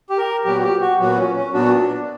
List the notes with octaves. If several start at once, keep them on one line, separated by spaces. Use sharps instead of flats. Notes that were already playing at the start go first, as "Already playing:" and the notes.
G4
A#4
A#2 F#3 B3 F#4 G4
G4
F#4
A#2 F#3 B3 F#4
C#4
C#4
A#2 F#3 B3 D4 F#4